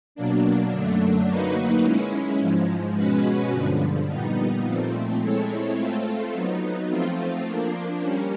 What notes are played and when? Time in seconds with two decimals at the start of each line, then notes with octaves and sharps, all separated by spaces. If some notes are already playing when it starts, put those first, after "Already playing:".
0.15 B2 F#3 A#3 D4
0.72 F#2 D3 F#3 A3 D4
1.27 F#3 A#3 D#4 F#4 B4
1.83 G#3 C#4 E4
2.40 G#2 F3 G#3
2.95 B2 G#3 C#4 F#4 B4
3.51 G2 D3 F3
4.08 A#2 G3 B3 D#4
4.64 A#2 F3 A3 C4
5.20 G#3 C4 E4 A4 C#5
5.76 A3 C4 F4 A4
6.33 F#3 B3 D#4
6.89 F3 A3 C4 F4
7.45 F3 A#3 D4
8.02 G3 A#3 C#4